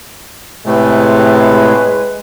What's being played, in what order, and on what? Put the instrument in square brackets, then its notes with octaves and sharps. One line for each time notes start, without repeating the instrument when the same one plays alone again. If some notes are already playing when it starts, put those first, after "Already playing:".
[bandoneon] A2 C3 A3 [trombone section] G#3 B4